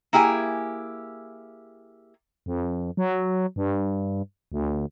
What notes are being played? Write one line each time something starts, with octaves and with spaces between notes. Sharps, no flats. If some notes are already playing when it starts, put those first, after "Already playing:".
A#3 E4 G4 G#4 G#5
F2
F#3
G2
D2